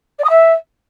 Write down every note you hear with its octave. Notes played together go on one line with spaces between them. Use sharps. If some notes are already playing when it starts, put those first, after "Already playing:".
D5
D#6
E5